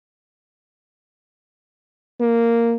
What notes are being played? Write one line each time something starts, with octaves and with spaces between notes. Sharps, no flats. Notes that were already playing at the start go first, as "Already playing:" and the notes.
A#3